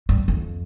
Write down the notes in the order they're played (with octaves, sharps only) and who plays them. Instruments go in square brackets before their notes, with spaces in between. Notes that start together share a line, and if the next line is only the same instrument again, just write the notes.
[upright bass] G2
F2